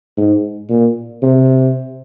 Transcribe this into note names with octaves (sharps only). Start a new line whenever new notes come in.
G#2
A#2
C3